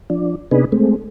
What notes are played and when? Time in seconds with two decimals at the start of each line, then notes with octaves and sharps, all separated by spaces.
0.10 F3 D4
0.51 C3 B3 D4 D#4 G#4 B4
0.72 G#3 A3 C4